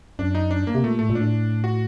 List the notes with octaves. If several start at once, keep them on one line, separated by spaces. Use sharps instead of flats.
F#2 D4
D#4
D4
A#3
C3
A#2 A3
A2 A3
A#2
A2 D4
F#4